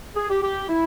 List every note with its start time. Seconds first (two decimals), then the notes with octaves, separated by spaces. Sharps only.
0.16 G#4
0.29 G4
0.42 G4
0.69 E4